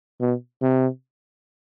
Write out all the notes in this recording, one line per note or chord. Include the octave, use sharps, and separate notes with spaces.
B2
C3